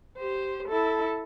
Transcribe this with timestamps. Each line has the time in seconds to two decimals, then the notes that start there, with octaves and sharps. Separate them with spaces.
0.18 G4 C5
0.68 E4 A4